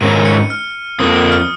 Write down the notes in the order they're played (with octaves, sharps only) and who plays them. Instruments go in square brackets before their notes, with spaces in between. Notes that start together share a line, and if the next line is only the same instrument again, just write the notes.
[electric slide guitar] G#2 D#3 C#4 [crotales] D#7
[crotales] C#7
F6
[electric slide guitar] F2 F3 A#3 [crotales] D#6
[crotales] D#6
F6